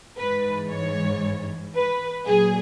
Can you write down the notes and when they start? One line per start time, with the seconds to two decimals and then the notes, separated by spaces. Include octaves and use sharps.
0.18 G#2 E3 B4
0.70 C#5
1.75 B4
2.26 A#2 F#3 G#4